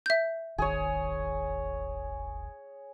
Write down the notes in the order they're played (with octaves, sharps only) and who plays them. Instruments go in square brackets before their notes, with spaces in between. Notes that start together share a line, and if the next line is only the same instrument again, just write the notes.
[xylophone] E5 G6
[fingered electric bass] D#1 G#1 D#3 [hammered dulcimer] G#4 C#5